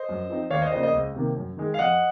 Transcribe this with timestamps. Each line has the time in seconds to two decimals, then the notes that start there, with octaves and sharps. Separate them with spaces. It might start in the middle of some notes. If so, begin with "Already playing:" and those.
Already playing: C5 D#5
0.09 F#2
0.29 F3 C4 D#4
0.50 D#2 C#5 F5
0.62 C5 D#5
0.72 C#3 F3 A#3 C5 D#5
0.82 C5 D#5
0.93 C#2
1.15 C3 D#3 A#3
1.36 F#2
1.57 D#3 G#3
1.74 F5
1.78 F2 D#5 F#5